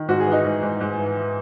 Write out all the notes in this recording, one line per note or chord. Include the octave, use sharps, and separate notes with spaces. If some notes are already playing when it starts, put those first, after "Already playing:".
Already playing: D#3
G#2 F#4
G#4
E3
D#4 F#4
G#2
G#2
G#2
E3
E3